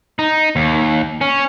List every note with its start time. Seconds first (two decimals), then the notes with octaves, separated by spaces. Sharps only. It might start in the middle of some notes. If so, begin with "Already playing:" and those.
0.19 D#4
0.56 D#2
1.21 C#4